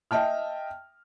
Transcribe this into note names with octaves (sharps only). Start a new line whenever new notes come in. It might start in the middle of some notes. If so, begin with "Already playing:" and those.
D#5 E5 G5 A5 F6